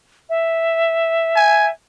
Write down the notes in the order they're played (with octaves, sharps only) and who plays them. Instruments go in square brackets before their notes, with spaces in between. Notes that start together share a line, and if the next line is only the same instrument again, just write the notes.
[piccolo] E5
[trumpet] G#5